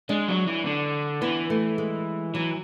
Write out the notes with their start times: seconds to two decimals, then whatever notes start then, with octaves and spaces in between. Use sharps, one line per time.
0.09 G#3 D4
0.28 F#3
0.47 E3
0.65 D3
1.22 E3 B3
1.50 A3
1.78 G#3
2.34 E3 F#3